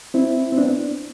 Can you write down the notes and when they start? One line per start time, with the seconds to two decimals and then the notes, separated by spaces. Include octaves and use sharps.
0.14 C4 E4
0.52 C4
0.58 B3 D4